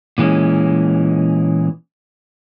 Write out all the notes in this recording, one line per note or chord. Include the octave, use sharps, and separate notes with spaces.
A#2 E3 G#3 C#4